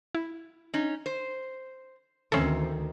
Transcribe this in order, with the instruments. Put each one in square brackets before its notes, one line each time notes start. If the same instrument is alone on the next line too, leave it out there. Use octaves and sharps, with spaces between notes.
[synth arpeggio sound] E4
[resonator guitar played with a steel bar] C#4 D#4
C5
[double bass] D2 D#3 [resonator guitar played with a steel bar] E3 C4 [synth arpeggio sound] C#4 A4